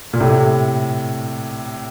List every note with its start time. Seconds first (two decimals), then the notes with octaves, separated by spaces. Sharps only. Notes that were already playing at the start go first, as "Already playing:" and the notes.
0.13 A#2
0.20 A2 C3